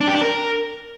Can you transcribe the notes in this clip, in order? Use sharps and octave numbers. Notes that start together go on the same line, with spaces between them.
D4
G4
D4
A#4